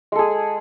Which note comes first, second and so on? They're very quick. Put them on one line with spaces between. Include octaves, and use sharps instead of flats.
G#3 A4 G#4